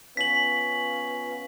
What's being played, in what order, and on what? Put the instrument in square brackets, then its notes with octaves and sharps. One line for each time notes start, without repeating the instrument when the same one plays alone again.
[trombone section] B3 C#4 F4 [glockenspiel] B6 F#7